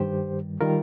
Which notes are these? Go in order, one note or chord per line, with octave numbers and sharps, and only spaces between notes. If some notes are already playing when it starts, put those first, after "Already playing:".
Already playing: G2 D#3 G3 G4 C5
D#3 G3 F4 A#4